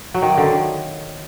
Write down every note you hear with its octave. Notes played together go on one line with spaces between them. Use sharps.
F#3
D#3
A#3
D3
D#3